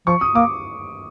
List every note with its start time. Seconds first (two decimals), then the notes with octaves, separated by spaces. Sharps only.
0.07 F3 C#6
0.21 D#6
0.35 A#3 D6